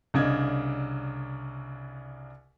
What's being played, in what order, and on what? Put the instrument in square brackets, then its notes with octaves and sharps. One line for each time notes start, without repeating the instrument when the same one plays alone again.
[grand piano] C2 C#3 D4 D#5 G#6